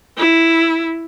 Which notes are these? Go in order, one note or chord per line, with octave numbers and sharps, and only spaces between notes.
E4